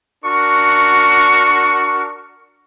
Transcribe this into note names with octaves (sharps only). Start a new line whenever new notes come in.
D4 F#4 A#4 C#6